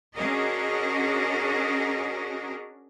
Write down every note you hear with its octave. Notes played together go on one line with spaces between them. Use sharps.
C#4 D4 F#4 G#4 A#4 D#5